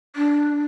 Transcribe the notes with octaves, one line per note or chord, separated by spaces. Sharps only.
D4